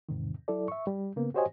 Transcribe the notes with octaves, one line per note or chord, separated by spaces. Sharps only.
E2 G#2 C3 D#3
F#3 E4 A4 D5
E5 C#6
G3
C#3 A#3 B3
F#4 G4 C5 C#5 D#5 G#5